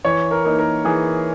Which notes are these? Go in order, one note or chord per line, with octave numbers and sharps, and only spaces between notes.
E3 C#5
A#4
A#3 D#4
A#4
E3 G#4